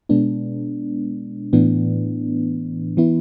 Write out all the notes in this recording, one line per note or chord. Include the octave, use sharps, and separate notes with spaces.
B2 G#3 B3 D4
A2 E3 B3 D4
E3 B3 E4